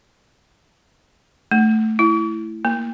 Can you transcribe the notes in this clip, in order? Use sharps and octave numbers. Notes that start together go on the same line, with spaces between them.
A3
E4
A#3